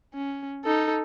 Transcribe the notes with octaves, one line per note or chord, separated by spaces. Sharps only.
C#4
D#4 A4